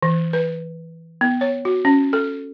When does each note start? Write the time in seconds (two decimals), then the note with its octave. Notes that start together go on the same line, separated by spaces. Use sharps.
0.03 E3
0.33 B4
1.21 B3
1.41 C#5
1.65 F#4
1.85 C#4
2.13 A4